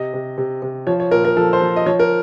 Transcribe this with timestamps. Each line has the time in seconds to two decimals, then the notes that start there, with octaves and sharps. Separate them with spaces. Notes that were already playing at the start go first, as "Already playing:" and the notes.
Already playing: C3 D#5
0.14 C3
0.38 C3
0.62 C3
0.87 F3 C#5
1.00 C#5
1.11 A#2 A#4
1.25 A#4
1.37 F3 A4
1.53 C5
1.62 F3
1.76 D#5
1.86 F3 C#5
2.00 A#4